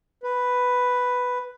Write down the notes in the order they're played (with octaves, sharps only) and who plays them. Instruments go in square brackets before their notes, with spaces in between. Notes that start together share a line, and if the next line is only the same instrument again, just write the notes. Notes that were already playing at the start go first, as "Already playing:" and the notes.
[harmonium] B4